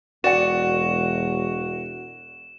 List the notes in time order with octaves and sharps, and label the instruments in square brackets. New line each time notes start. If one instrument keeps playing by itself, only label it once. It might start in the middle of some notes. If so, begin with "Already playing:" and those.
[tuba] E1 [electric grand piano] F#4 [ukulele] D5 F#5 [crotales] E7